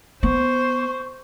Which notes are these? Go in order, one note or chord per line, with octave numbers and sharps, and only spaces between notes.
B3 C5 C#6